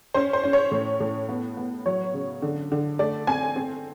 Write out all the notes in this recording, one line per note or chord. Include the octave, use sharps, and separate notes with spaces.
C#4 C5
C5
C#4
C#5
A2
A2
B3
B3
F#3 C#5
C#3
D3
D3
A3 D5
C4 G#5
C4